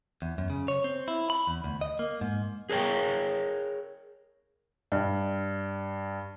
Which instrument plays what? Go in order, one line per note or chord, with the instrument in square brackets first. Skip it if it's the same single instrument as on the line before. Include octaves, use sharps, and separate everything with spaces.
[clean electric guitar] E2
F#2
C#3
C#5
C4
E4
B5
E2
D2
D#5
A#3
G#2
[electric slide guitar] G#4 A#4 C#5 G5
[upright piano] G2